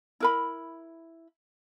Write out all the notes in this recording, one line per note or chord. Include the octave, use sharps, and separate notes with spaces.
E4 A#4 B5